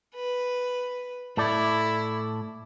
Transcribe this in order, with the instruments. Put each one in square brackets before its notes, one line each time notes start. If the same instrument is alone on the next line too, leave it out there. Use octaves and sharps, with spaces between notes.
[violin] B4
[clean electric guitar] A2 A4 D5 [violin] E4